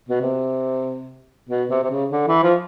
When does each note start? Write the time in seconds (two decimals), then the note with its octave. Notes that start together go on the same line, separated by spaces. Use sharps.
0.09 B2
0.21 C3
1.49 B2
1.70 C3
1.83 C3
1.90 C#3
2.12 D3
2.27 E3
2.43 F3